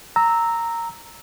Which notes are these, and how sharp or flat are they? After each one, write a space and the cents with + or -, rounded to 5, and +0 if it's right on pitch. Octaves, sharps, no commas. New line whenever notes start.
A#5 -10 E6 -10